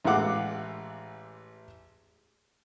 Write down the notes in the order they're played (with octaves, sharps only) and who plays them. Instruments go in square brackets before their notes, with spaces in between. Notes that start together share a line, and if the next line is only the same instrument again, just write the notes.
[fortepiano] A1 E3 G#3 F5 F#5 D6